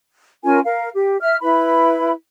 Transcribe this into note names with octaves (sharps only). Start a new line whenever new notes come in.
C#4 F4 A#4 G#5
A#4 F5
G4
E5 F6
E4 B4 B5